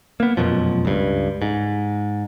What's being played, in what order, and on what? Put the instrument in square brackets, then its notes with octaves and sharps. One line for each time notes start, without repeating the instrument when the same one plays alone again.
[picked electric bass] A#3 B3
F1 F#2 B2 F3
C#2 G2
G#2